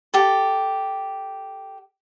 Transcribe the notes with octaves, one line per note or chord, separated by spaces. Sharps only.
G4 A4